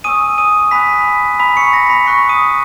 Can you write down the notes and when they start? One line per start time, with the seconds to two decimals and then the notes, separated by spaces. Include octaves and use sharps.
0.04 G#5 C#6 D#6 E6 D#7
0.38 D#6 D#7
0.71 G#5 B5 D#6 F#6 B6
1.39 A#5 B5 E6 B6
1.57 C#6 C#7
1.73 A#6
1.90 B5 B6
2.06 B5 C#6 D#6 F#6 C#7
2.29 D#6 D#7